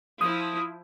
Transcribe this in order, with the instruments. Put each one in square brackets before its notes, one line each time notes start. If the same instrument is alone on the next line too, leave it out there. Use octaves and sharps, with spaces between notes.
[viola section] F3 E4 [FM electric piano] D#6